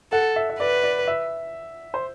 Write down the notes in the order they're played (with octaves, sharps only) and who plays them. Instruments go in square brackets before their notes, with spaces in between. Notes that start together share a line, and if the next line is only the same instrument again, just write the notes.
[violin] A4 [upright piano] F#5
[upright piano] E5
E5
[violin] B4 [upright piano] D5
[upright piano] D5
E5
C5